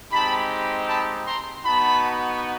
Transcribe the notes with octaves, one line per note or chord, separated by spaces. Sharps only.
G#3 C4 D#4 G4 A5 B5
A5 B5
A#5 C6
B3 D#4 F#4 A5 B5